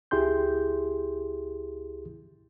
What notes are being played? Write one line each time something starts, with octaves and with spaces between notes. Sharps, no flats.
C#2 E4 G4 G#4 C6 G6